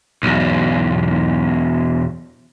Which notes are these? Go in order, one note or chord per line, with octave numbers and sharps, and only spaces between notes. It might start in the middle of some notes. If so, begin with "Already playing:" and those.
B1 E2